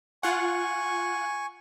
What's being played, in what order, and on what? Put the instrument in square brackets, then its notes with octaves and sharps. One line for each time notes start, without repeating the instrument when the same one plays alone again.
[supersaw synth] F4 F#5 [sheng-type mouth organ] G#5 C#6